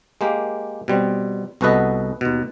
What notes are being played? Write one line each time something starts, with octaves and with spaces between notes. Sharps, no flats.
G#3 A#3 G4
B2 G3 C4
C2 B3 F#4 A4 B4 D#5
D#2 B2